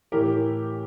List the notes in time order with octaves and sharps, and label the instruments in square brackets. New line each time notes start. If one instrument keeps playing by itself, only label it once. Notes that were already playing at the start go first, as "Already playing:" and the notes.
[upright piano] A2 E3 G4 A#4